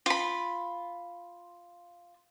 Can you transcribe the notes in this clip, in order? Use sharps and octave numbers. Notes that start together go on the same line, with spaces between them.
F4 B5